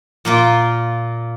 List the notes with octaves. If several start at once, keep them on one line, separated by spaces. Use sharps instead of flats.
A#2 A#3 F4